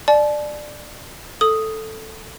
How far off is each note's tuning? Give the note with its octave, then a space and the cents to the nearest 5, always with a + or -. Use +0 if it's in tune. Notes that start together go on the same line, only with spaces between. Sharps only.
D5 +15 A5 -40
A4 +0 D#6 +0